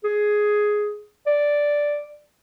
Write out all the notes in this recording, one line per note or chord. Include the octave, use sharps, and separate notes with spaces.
G#4
D5